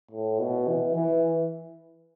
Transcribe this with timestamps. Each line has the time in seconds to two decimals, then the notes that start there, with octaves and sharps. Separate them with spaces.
0.11 A2
0.40 B2
0.67 E3
0.95 E3